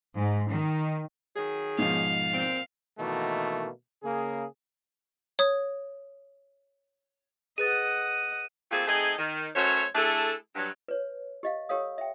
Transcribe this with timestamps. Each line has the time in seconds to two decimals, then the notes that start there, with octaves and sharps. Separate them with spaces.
0.16 G#2
0.50 D#3
1.36 D#3 F#3 G#4
1.79 G#2 B2 F3 F5
2.33 A#2 C4
2.98 B2 D#3 E3 A3 A#3 F#4
4.03 C#3 A#3 G#4
5.39 C#5 D#6
7.58 G#4 B4 D#5 F#5 A6 D#7
8.71 G3 A3 A#3 C4 F4 G#4
8.87 A3 C4 D#4 G#4
9.18 D#3
9.55 F#2 A3 F#4 C5 C#5
9.95 A3 D4 E4 G#4 A4
10.55 G2 F#3
10.88 B4 C#5
11.43 G4 D#5 F5
11.69 G4 A4 A#4 C#5 F5 D#6
11.98 E5 G5